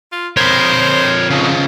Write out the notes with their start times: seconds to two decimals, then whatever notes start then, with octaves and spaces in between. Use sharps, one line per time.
0.12 F4
0.37 F2 A#4 C5 C#5 B5
1.30 C#3 F3